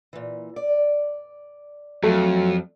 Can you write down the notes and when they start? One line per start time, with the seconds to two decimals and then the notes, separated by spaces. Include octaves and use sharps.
0.13 A#2 E3
0.56 D5
2.03 F2 F#3 A3